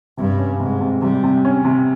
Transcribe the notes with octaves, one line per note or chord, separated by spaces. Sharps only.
G2 C3
C#4
G#2 C3
C3
C3 G3
C3
C#4
C3